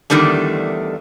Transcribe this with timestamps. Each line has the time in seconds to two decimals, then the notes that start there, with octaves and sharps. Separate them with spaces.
0.10 E2 D3 D#3 G3 A3